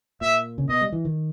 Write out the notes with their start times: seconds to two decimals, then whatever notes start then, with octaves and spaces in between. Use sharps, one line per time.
0.21 A#2 E5
0.58 C#3
0.69 B2 D#5
0.81 G3
0.92 E3
1.05 D#3